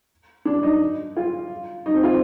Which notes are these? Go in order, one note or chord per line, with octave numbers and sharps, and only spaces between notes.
D4
D#4
F4
D#4
C4
F4